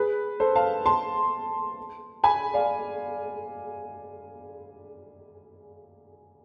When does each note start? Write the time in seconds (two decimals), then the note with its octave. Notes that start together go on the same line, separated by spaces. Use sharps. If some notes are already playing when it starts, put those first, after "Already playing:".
Already playing: G#4 B4
0.40 A4 C5
0.56 F5 A5
0.86 A5 C6
2.24 G#5 B5
2.54 D5 F5